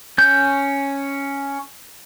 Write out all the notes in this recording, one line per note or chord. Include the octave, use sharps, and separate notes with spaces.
C#4 G6